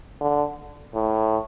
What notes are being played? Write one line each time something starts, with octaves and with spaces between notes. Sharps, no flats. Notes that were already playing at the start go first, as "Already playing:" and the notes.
D3
A2